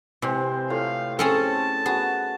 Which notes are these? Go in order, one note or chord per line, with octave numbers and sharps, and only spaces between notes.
C3 E3 G#3 C4
A2 A3 F4 F5
C4 C#4 G#4 A4 A5
B3 F#4 G#4